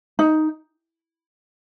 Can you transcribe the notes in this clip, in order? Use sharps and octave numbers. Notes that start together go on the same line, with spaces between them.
D#4